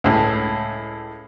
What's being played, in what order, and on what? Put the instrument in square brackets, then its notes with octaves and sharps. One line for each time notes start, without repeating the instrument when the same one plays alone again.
[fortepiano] C#2 A2